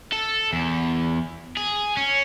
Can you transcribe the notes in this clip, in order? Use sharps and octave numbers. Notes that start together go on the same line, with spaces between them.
A4
E2
G#4
C#4